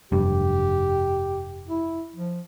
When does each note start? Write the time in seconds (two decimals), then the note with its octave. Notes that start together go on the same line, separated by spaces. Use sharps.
0.12 F1 G2 G4
1.68 E4
2.16 F3